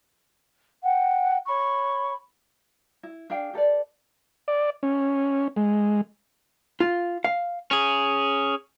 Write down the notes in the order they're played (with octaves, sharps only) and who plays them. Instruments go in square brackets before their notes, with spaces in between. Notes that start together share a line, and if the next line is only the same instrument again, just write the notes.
[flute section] F#5 G5
C#5 B5 C#6
[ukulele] E4
D4 G#4 F5 G5
G4 A4 B4 D5
[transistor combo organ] D5
C#4
G#3
[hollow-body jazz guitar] F4
F5
[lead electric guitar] C#4 G#4